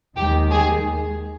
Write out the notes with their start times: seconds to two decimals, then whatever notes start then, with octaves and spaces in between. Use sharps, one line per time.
0.17 D#2 D#3 G#3 G4
0.51 G#4